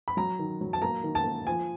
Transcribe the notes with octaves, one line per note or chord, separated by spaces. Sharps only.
B5
F#3 A#5
D#3
F#3
A5
A#3 A#5
D#3
A5
A#3
F3 G#5